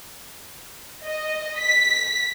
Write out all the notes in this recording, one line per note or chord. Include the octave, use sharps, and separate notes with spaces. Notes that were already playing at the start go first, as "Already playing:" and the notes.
D#5
B6